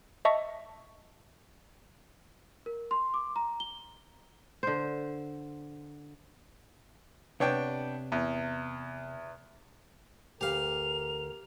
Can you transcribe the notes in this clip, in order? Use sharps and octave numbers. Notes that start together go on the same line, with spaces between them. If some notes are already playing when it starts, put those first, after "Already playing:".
D#5 E5 A5 C#6
A#4
C6
D6
A#5
G7
D3 C5
C3 B3 D4 C#5 G5
E2
D2 G4 A#4 B4 F5 F7